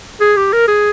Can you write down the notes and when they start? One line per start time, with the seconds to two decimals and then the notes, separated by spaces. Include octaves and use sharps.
0.20 G#4
0.36 G4
0.53 A#4
0.68 G#4